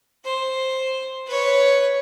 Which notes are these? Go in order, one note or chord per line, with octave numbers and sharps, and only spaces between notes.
C5
B4 C#5